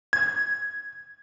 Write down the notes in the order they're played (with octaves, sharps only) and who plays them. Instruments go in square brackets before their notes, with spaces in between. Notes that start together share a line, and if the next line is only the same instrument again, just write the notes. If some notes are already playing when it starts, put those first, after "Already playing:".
[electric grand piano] G#6